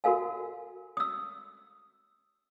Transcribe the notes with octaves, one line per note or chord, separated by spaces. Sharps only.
F#4 A4 A#4 F5 G#5
D#6 E6